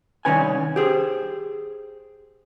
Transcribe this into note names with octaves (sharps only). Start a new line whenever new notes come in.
C2 B2 D#3 C#4 B4 G#5
G4 G#4 C5